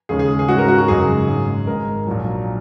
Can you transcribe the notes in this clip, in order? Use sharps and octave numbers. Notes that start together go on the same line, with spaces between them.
D#2 C#3 G#3 C#4 G#4
G#4
G#4
G#2 D#3 G#3 C#4 F#4
A#4
F#4
F#4
G#1 F#2 C#3 G#3 D#4 G#4
G#1 G#2 G#3 C#4
G#1 G#2 G#3 D#4 A#4
A#1 A#2 F#3